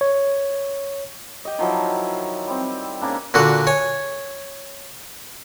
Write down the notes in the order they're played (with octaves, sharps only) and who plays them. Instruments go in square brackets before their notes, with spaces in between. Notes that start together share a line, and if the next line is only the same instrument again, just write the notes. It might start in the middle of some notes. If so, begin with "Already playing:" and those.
[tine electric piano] C#5
[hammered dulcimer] G4 D#5
D#3 F3 F#3 E4
G3 C4
C#3 A#3 D4
[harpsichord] A#2 D3 F#4 C#6
C#5 G#5